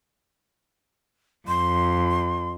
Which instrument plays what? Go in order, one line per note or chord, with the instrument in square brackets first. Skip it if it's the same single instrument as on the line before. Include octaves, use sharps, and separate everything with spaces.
[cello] F2 [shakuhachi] C6